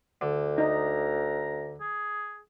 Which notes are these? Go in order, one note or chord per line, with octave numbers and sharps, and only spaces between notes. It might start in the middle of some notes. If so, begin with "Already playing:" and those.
D2 D3
D#4 A#5
G#4